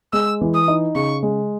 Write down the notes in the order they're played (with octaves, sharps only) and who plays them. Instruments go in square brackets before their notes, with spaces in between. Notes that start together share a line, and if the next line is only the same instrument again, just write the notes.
[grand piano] G#3 [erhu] E6
[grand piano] E3
[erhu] D#6
[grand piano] D#4
[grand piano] C#3 [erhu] C#6
[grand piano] G#3